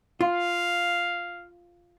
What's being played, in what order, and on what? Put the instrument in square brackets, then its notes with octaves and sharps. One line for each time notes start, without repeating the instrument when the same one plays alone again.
[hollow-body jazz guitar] F4 [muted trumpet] F5